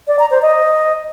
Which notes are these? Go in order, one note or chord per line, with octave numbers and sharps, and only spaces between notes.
D5
A#5
C5
D#5